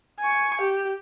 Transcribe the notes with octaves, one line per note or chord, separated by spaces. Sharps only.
G#5 C#6
G4